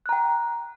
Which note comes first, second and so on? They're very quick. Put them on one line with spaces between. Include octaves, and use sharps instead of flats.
F#6 A#5 G5